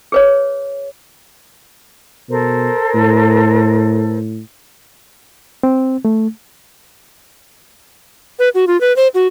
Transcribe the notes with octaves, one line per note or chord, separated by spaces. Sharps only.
G#4 B4 C#5
B2 A4 A#4 C5
A2
C4
A3
B4
F#4
F4
B4
C5
F#4